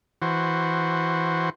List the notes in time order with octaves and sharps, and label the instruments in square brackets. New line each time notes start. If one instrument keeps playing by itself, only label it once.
[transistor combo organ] E3 F#4 C5